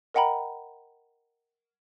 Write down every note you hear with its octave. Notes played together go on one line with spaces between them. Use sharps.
A#4 D#5 F#5 G5 A#5 B5